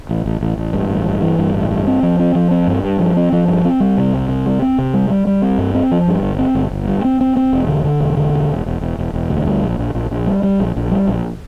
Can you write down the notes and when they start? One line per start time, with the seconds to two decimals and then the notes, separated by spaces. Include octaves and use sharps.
0.09 A1
0.26 A1
0.41 A1
0.57 A1
0.73 G2
0.90 A1
1.06 G2
1.22 E3
1.39 G2
1.54 A1
1.71 G2
1.87 C4
2.03 F3
2.19 C4
2.35 F3
2.51 C4
2.67 G2
2.84 G2
3.00 F3
3.16 C4
3.33 F3
3.48 G2
3.65 C4
3.80 G3
3.98 C3
4.13 C2
4.29 C3
4.46 G3
4.62 C4
4.78 C3
4.94 G3
5.10 G3
5.27 G3
5.42 C4
5.58 G2
5.75 C4
5.91 F3
6.08 G2
6.23 G1
6.39 C4
6.55 G1
6.71 G1
6.88 G2
7.04 C4
7.21 C4
7.37 C4
7.53 E1
7.68 D3
7.84 D3
8.00 E1
8.17 D3
8.33 E1
8.49 E1
8.66 E1
8.81 E1
8.98 E1
9.14 E1
9.30 D2
9.46 G3
9.62 A#1
9.79 A#1
9.95 A#1
10.11 A#1
10.27 G3
10.43 G3
10.60 A#1
10.76 A#1
10.91 G3
11.07 A#1